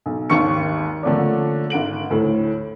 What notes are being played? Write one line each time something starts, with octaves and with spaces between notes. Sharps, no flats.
B1
G#1 D#2 G4 C#6 C#7
D3 F3 A3 A#3 C#4 D4
G#1 F#5 D7 F#7
D2 A2